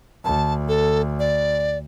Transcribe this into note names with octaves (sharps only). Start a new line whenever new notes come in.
D2 A5
A4
D5